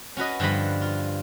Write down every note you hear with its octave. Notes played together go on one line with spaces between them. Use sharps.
C#4 F#4 B4 D#5
G2 D3 F3 D#5 B5
F4